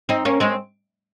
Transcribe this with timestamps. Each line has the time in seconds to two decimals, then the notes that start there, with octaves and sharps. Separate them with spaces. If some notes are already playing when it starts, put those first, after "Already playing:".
0.09 C4 D#4
0.25 A#3 C#4
0.40 G#3 C4